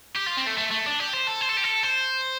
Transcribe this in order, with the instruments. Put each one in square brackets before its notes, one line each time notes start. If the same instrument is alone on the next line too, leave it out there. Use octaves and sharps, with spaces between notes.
[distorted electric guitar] G4
F4
C4
A3
A3
A3
D4
G4
C5
A4
C5
A4
G4
A4
C5